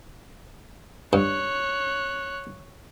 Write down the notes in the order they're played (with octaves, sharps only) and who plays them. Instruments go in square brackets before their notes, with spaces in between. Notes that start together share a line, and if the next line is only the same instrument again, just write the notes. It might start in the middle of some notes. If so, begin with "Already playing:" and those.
[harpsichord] G2 [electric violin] C#5 F#6